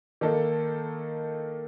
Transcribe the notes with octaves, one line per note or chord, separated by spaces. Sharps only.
D#3 A#3 D#4 A4